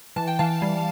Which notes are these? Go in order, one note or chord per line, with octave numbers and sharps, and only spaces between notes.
E3 A5
G5
E3 F5 A5
G3